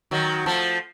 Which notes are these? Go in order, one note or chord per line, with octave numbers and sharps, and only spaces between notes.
D#3 F#3
F3 A3